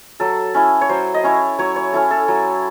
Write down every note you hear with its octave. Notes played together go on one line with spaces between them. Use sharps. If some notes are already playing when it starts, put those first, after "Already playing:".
F#3 A4
C#4 E4
C#5
F#3 C5
D#5
C#4 E4 C#5
F#3 C#5
C#5
C#4 E4 A4
A4
F#3